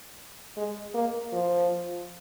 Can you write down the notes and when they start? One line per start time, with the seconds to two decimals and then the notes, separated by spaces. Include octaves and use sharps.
0.57 G#3
0.94 A#3
1.33 F3